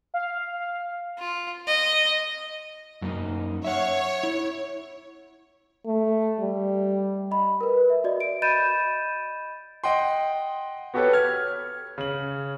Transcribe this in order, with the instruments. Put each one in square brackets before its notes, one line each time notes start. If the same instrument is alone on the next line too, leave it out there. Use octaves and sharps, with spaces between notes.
[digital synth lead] F5
[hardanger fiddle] F4
D#5
[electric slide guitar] F#2 A#3 D#4
[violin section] C#5 [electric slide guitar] E5 F#5
[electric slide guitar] E4
[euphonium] A3
G3
[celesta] D#5 B5
A#4 B4
E5
F#4 D5 D#5
D7
D#5 B5 G6 A6 D#7 E7
[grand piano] D#5 F#5 G5 C6
B3 F#4 G4 A4 B4 C#5
F6 G#6
C#3 F#7